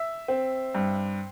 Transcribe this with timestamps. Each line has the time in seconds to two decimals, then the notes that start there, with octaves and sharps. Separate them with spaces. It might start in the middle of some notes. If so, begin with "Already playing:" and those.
Already playing: E5
0.28 C4
0.75 G2